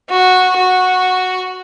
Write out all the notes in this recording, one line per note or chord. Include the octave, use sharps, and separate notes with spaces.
F#4
F#4